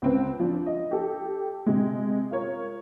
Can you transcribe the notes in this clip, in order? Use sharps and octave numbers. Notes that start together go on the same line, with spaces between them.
C#2 C4 B4
F3 D4
D#5
G4 A4
C3 G#3
F4 A#4 C#5